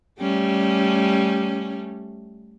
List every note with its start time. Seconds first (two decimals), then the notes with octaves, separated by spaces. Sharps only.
0.20 G3 A3 C#4